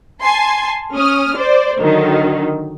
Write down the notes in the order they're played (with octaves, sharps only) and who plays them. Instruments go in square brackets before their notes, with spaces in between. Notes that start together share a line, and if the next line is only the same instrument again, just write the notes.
[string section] G#5 A5 C6
C#4 D#6 F6
C5 D5
D3 D#3 F#3